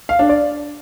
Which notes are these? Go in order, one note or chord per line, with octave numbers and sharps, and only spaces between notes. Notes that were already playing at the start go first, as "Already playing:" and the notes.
F5
D4
D5